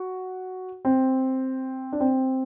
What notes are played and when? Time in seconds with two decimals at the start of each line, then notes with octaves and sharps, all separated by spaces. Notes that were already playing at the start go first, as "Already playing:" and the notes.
Already playing: F#4
0.85 C4
1.93 D4
2.00 C4